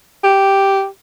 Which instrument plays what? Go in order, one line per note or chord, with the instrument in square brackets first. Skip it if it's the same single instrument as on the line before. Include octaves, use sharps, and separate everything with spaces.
[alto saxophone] G4